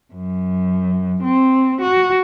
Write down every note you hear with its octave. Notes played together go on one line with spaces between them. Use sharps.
F#2
C4
F#4